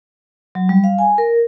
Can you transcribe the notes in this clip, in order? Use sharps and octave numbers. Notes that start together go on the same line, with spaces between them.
F#3
G3
F5
G#5
A#4